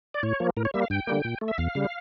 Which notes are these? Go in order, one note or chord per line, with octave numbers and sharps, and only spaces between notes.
D5
A2 C#5
F3 A#3
A2 A#4
C#5
G3 A#3 E5
F5
G2 G5
D3 G3 A#3
A#2
A3
E5
E2 F5
C#3 G3